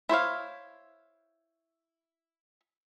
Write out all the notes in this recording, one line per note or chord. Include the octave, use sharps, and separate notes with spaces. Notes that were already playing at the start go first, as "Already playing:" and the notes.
E4 C5 C#5 F5